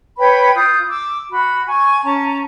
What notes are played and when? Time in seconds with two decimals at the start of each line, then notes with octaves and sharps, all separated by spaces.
0.19 B4 C#5 G5 B5
0.55 F4 D#6 G6
0.89 D6 E6
1.31 F#4 B5
1.66 G#5 C#6
2.05 C#4 A5 A#5